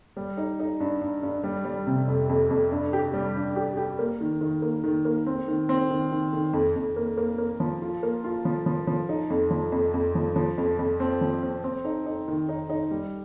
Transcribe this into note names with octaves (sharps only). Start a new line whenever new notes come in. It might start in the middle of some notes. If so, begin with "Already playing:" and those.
G3
D#4
D#4
G2
G2
G2
G3
G3
C3
F2
F2
F2
G2
G4
G3
G2
G4
G4
A#3
D#3
D#3
A#3
D#3
A#3
C4
D#3
C4
D#3
D#3
D#3
F2
F2
A#3
A#3
A#3
F3
F4
A#3
F4
F3
F3
F3
D#4
F2
F3
F2
F2
F3
F3
F2
F2
C4
F3
C4
C4
D#4
D#4
D#3
D#4
D#4
G3